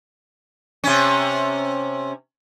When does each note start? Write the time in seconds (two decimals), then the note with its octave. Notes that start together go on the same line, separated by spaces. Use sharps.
0.84 C3 C#4